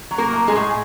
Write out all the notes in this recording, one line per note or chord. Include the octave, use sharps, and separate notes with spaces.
F#3
A#3 A#4
A2
G#3 G#4
A2